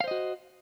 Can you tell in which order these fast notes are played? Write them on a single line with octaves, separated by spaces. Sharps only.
F5 C5 D#5 F#4